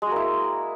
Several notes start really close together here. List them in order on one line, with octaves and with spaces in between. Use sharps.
G#3 F#4 A#3 E4